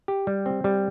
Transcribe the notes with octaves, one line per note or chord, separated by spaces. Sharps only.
G4
G3
C4
G3